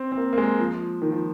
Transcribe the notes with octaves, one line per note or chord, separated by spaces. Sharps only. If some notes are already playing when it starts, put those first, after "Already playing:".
Already playing: C4
C4
A#3
A#3
G#3
F3
D#3
F3